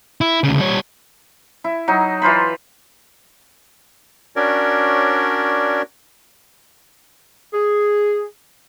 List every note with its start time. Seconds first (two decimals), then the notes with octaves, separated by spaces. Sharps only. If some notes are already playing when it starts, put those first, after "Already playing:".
0.21 E4
0.43 D2 C#3
0.59 G3 C#5
1.64 E4
1.88 F#3 D#4
2.22 E3 F4 C5 B5
4.36 C#4 D4 F#4 A#4 C#5 D5
7.53 G#4